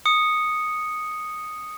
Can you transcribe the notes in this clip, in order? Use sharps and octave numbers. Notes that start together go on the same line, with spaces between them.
D#6 C#7